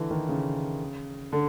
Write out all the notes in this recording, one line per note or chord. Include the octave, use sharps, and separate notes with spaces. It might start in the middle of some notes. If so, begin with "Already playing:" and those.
Already playing: D3 E3
D#3
C#3
D3